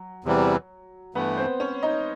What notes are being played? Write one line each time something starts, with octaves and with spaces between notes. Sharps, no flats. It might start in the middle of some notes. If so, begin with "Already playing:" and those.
Already playing: F#3
E2 C3 E3 G3
G2 E3 A3 B3 B4
C4 C5
C#4 C#5
D#4 D#5